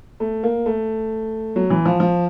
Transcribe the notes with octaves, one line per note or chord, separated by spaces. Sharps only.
A3
A#3
A3
F#3
E3
F3
F3